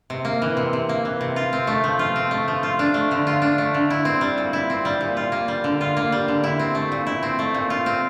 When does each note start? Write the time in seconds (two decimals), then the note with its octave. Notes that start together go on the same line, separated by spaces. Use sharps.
0.10 C3
0.25 A#3
0.42 E3
0.57 C3
0.73 C3
0.89 A#3
1.05 E3
1.21 C3
1.36 F4
1.53 C4
1.67 A3
1.84 F3
1.99 F4
2.16 C4
2.31 A3
2.48 F3
2.63 F4
2.79 D4
2.94 A3
3.11 D3
3.27 F4
3.42 D4
3.58 A3
3.74 D3
3.90 E4
4.05 C4
4.21 G3
4.38 A#2
4.53 E4
4.70 C4
4.85 G3
5.01 A#2
5.17 F4
5.32 A#3
5.48 G3
5.64 D3
5.81 F4
5.97 A#3
6.12 G3
6.28 D3
6.44 E4
6.59 C4
6.75 A3
6.92 A#2
7.07 E4
7.23 C4
7.39 A3
7.54 A#2
7.70 F4
7.86 C4